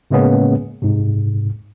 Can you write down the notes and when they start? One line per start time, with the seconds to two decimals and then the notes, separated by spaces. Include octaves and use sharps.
0.11 A2 C#3 G#3 A#3 B3 C#4
0.82 G#2 C3